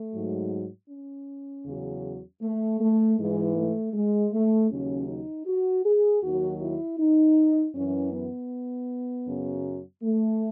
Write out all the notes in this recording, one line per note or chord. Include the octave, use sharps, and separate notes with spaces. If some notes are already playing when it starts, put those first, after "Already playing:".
Already playing: A3
G#2 F#3
C#4
E2 C#3 F#3
A3
A3
G#2 E3 G#3
A3
G#3
A3
D#2 C#3 F#3 C#4
D#4
F#4
G#4
D#2 D#3 F#3 F#4
E4
D#4
F#2 E3 C#4
B3
F#2 C#3 F#3
A3